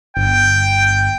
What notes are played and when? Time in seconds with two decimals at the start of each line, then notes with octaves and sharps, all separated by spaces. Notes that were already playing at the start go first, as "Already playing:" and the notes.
0.17 G1 G5